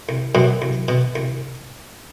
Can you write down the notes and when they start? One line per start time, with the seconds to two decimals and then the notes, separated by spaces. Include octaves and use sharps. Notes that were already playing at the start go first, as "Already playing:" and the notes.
0.09 C2
0.35 F#2 B2 F#3
0.62 C2
0.88 B2
1.15 C2